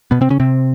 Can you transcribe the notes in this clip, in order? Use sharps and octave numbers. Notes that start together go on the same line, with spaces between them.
B2 B3
C3 C4
C#3 C#4
C3 C4